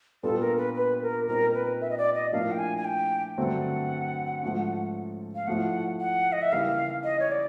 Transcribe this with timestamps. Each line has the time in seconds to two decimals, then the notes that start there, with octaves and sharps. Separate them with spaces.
0.23 A#2 G3 B3 D4 F4 A4
0.41 A#4
0.58 B4
0.75 B4
1.02 A#4
1.28 A#2 G3 C4 D#4 A#4
1.54 B4
1.81 E5
1.90 D#5
1.98 D5
2.15 D#5
2.32 A2 F3 A#3 D4 F5
2.52 G5
2.59 G#5
2.77 G#5
2.85 G5
3.38 G2 D3 F#3 A3 C4 F#5
4.43 G#2 F3 A3 C#4
5.35 F5
5.47 A2 F3 A3 F#5
6.00 F#5
6.32 D#5
6.42 E5
6.52 C#3 E3 G3 A#3 D#4 F5
7.04 D#5
7.20 C#5
7.31 D5